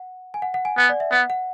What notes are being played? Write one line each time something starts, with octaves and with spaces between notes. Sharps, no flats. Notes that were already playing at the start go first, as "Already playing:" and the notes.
Already playing: F#5
G#5
F#5
F#5
G#5
B3 F#5
D5
E5
B3 F#5
F#5